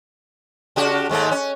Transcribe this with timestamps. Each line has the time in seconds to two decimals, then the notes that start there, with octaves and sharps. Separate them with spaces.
0.76 C#3 F#4 G4
1.09 D#2 G#2 A3
1.31 C#4